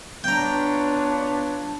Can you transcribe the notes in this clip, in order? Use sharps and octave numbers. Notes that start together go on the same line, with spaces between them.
B3 D4 F4 B4 C#5 G5 A#5